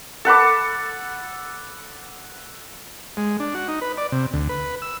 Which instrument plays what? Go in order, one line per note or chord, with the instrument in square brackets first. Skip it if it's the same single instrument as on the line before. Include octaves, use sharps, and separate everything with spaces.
[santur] A4 F#5 B5 D6
[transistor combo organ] G#3
D4
F#4
D#4
B4
D5
C3
D2
B4
E6